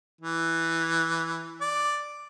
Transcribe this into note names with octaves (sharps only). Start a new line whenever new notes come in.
E3
D5